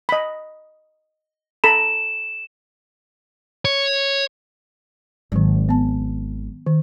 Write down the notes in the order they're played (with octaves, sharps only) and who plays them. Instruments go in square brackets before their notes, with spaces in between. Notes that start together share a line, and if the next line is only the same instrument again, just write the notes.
[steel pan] D#5 B5
[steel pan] A4 A#5 B5 [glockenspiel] E7
[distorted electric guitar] C#5
[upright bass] G#1 [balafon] D#3 F#3
[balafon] B3 A5
D#3